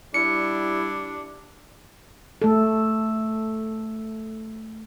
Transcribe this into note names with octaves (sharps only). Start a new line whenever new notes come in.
G3 D4 E4 C#7
A3 A4